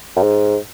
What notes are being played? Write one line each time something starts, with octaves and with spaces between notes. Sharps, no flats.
F#2
G#2